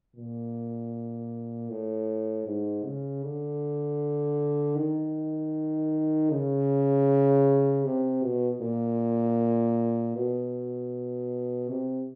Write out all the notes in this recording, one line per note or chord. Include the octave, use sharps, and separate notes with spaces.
A#2
A2
G#2
C#3
D3
D#3
C#3
C3
B2
A#2
B2
C3